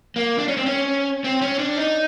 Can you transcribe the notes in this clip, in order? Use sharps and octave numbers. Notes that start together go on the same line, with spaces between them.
A#3
D4
C#4
C4
C#4
C4
C#4
D4
D#4